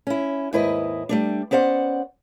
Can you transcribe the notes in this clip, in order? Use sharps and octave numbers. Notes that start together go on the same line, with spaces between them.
C#4 E4
D#2 G#2 E4 B4 D#5
G3 A3 D4
B3 C#4 C5 D5 F#5